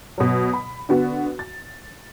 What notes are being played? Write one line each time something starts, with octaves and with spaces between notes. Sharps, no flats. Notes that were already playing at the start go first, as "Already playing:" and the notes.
B2 F#3
B5
D3 B3 F#4
A6